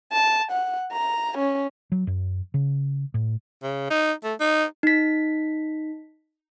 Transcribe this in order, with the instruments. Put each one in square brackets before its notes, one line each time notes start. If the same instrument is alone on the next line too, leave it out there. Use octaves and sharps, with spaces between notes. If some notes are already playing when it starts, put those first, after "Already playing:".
[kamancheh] A5
F#5
A#5
C#4
[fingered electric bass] F#3
F#2
C#3
A2
[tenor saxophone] C#3
D#4
A3
D#4
[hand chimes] D#4 B6